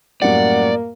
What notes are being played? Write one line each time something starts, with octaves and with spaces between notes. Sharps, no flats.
F#2 A2 G3 A#3 D5 F#5